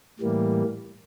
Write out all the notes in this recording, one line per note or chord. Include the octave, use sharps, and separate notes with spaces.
A2 E3 G3 A#3